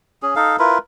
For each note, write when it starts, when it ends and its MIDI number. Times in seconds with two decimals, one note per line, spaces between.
0.22 0.34 61
0.22 0.34 68
0.36 0.56 63
0.36 0.56 69
0.36 0.56 77
0.59 0.78 64
0.59 0.78 65
0.59 0.78 70
0.59 0.78 71